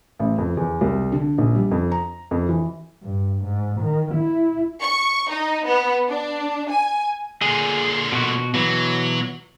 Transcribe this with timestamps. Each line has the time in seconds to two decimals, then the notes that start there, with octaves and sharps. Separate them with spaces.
0.19 A1
0.38 F2
0.57 E2
0.81 C2
1.12 D3
1.38 A#1
1.55 G3
1.71 F2
1.92 A#5
2.31 F2
2.49 E3
3.03 G2
3.44 G#2
3.81 D#3
4.14 E4
4.82 C#6
5.30 D#4
5.66 B3
6.09 D4
6.70 G#5
7.42 A#2 D3 G#4
8.12 B2 F#4
8.54 B2 E3 F#3